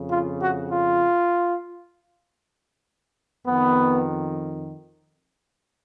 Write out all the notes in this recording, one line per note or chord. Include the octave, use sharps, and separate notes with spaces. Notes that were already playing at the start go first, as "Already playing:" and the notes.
Already playing: F2 C#3
F4
F#4
F4
F2 D#3 B3